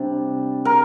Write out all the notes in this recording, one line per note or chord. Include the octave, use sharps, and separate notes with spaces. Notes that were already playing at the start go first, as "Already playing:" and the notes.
Already playing: C3 G3 D4
A#4